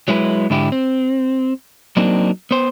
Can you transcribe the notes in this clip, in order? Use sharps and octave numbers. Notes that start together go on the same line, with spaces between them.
F#3 G#3 E4 A4 B4
G#2 D3 E4 G4
C4
F#3 A#3 C4 D4 D#4
B3 C5